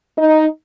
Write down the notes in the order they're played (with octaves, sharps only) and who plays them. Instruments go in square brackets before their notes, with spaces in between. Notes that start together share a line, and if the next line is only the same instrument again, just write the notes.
[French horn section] D#4